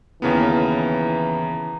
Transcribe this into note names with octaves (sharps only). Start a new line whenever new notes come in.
D#2 C#3 E3 B3 A#4